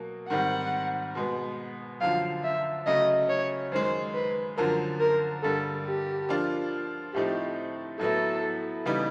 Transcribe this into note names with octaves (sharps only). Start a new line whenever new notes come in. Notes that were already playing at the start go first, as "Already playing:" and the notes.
Already playing: B2 F#3 A#3
G#2 D#3 G3 C4 F#5
B2 G#3 B3
F#2 D3 F3 F5
E5
C#3 F#3 A3 D#5
C#5
F#2 D#3 G#3 C5
B4
F#2 D3 F3 A#4
A#4
G2 D3 G3 A#3 A4
G4
F3 A#3 D4 F4
A2 F3 A3 C4 D#4 G4
A2 F#3 B3 E4 A4
C#3 E3 G3 B3 D#4